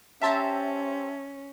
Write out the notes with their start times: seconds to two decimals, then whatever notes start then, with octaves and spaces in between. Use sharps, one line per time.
0.22 C#4 G4 C5 E5 A5 A#5